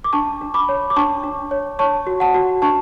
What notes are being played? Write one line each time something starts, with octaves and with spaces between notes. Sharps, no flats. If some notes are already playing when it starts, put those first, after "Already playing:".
D6
D4 A5 C#6
D4
B5 D6
C#5
D6
D4 A5 C#6
D4
C#5
C#5 A5 C#6
F#4
F#5 A5
F#4
D4 A5 C#6